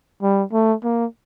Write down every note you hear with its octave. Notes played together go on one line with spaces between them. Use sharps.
G3
A3
A#3